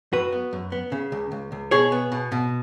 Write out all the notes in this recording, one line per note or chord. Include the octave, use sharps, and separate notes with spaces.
F#2 F#4 B4
B3
F#2
B3
C#3
C#2
C#2
C#2
B2 G#4 C#5
B3
B2
B2